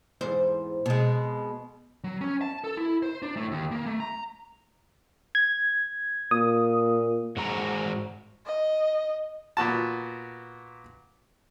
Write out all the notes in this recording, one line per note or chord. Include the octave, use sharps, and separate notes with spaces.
E2 G#2 C5
B2 G#3
F#3
C#4
A5
A4
E4
C5
D4
A2
D#2
A#3
A3
A#5
G#6
A#2 D#6
G#2 F#4 A#5
D#5
A#2 B3 F#4 A5